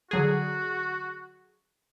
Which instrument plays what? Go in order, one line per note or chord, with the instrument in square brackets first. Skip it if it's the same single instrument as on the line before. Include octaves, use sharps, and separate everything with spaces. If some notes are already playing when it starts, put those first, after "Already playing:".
[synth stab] D3 F#3 G#4 [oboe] F#4